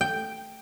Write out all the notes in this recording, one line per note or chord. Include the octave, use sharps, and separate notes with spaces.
G5